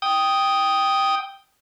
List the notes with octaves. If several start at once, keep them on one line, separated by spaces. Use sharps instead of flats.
G5 D#6